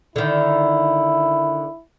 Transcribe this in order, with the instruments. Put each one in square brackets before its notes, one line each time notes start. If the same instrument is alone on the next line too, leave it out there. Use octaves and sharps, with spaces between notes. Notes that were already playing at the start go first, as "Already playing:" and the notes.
[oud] D3 D#3 [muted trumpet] E4